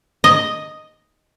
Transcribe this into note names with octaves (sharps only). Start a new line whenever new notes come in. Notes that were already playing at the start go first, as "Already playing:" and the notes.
D#5